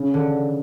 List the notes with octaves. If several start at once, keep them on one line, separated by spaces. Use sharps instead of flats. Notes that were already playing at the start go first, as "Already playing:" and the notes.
Already playing: C#3
D3